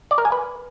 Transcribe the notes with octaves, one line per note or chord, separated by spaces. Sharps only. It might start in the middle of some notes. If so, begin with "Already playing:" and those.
D5
A#4
G#5
B4